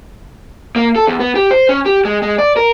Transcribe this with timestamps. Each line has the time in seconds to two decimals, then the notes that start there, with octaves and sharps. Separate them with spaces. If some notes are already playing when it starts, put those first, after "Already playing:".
0.76 A#3
0.96 A4
1.07 E2
1.20 B3
1.35 G4
1.51 C5
1.69 C#4
1.86 G4
2.05 G#3
2.22 G#3
2.38 D5
2.56 A#4